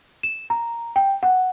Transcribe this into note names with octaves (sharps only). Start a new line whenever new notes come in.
E7
A#5
G5
F#5